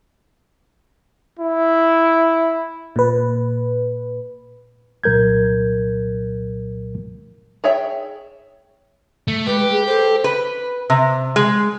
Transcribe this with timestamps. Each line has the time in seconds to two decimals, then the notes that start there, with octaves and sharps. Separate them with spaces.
1.39 E4
2.96 A#2 B4
5.04 C2 A#2 F#3 A#4 G6 G#6
7.64 G#4 C#5 E5 G5
9.28 A3
9.47 G#3 G4 B4
9.71 G#4
9.87 A4 C5
10.24 B4
10.90 C3
11.36 G#3